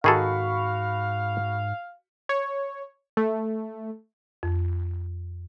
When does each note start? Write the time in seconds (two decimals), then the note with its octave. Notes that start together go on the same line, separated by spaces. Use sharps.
0.04 G#2 D#3 F#4 G#4 A4 F5 B5 C#6
2.29 C#5
3.17 A3
4.43 F2